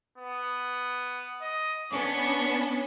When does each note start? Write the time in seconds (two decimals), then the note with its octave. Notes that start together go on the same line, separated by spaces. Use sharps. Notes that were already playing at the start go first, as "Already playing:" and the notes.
0.18 B3
1.41 D#5
1.92 B3 C#4 D4 C#6